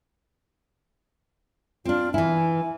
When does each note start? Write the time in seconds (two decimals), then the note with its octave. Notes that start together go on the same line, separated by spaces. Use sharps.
1.85 C4 D4 F4
2.14 E3 E4 G#5